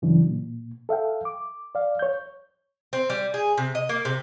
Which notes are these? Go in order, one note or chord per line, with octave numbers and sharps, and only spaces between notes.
G2 C#3 E3 F#3 D4
A#2
A4 E5 F5 G5
D6
D5 F5
C#5 G6
C4
G3
G#4
C3
D#5
A#3
C3